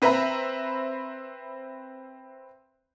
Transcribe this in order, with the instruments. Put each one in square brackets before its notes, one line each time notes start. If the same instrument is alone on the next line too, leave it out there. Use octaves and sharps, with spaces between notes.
[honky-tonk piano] C4 B4 C5 E5 A#5 B5